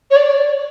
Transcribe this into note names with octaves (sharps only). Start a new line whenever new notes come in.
C#5
D5